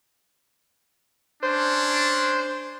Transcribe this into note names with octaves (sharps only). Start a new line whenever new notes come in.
C#4 D4 C5